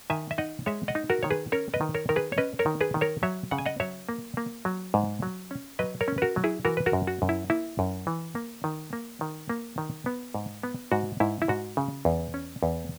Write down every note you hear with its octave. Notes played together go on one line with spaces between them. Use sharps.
D#3 E5 G#5
E5
D#4 D#5 F#5
G#3 C#5 E5
D#5 F#5
D#4
F#4 A#4
D#3 C#5
G#4 B4
C#4 A#4 C#5
B4 D#5
D#3
A#4 C#5
D#3 A#4
G#4 B4
C#5
C#4 B4 D#5
A#4 C#5
D#3
G#4 B4
D#3
A#4 C#5
F#3 C#5 E5
C#3 F#5
G#5
D#5 F#5
F#3 C#5 E5
A#3
A#3
F#3
G#2
F#3
C#4
F#3 B4 D#5
A#4 C#5
C#4
B4
F#4 A#4
F#3
E4 G#4
E3 F#4 A#4
B4
F#4 A#4
F#2
F#4
F#2
E4
A#3 E4
F#2
E3
A#3
D#3
A#3
D#3
A#3
D#3
B3
G#2
B3
G#2 F#4
G#2 E4
E4
G#2 F#4
C#3
E2
C#4
E2